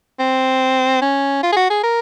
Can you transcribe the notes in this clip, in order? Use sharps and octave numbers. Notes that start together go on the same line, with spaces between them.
C4
C#4
F4
G#4
F#4
G#4
A#4